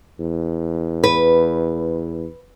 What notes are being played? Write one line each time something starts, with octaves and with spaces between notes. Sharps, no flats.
E2
B4